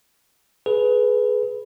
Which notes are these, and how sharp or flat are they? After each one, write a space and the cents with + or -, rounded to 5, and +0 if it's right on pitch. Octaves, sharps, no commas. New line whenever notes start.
G#4 +25 B4 +0